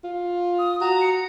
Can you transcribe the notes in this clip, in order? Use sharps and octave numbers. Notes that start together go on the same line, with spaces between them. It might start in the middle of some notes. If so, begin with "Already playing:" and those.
F4
D#6
F#4 A#5
C#7